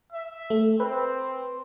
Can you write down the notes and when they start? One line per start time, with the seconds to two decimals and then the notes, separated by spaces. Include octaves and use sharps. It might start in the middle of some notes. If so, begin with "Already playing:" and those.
0.13 E5
0.50 A3
0.80 C4 B4